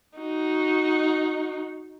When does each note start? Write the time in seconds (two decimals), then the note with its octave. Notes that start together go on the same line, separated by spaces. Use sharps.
0.18 D#4 F#4